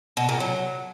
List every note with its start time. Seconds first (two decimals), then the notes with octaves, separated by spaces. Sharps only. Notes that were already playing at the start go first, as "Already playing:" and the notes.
0.17 B2
0.29 A#2
0.40 F#3